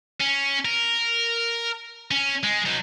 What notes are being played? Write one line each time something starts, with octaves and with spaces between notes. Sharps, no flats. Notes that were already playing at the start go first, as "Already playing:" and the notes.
C#4
A#4
C#4
G#3
F#3 D#4